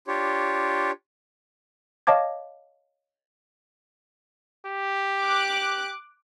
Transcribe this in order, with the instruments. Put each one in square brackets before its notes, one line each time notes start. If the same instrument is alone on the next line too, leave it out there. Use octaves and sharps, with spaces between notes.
[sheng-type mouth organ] D4 F4 G4 C#5
[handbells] C#5 D#5 F5 A5 D6 G#6
[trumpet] G4
[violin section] D6 F#6